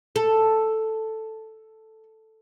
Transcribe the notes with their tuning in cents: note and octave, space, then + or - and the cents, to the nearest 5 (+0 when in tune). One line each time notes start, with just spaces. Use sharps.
A4 +0